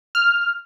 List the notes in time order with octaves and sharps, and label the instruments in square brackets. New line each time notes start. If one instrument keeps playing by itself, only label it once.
[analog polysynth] F6